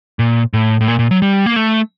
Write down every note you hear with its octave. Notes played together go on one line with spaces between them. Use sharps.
A#2
A2
A2
A#2
A#2
F#3
G3
A#3
A3